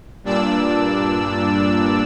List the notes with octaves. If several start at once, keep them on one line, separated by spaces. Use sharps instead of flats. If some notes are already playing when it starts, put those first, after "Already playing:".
G2 A#2 D4 D5 E6